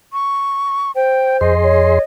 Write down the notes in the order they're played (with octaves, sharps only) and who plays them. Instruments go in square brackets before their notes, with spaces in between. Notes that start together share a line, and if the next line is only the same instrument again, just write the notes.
[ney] C#6
[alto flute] C5 [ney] G5
[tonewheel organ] F2 G#4 C6 [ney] D#5
[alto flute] C#5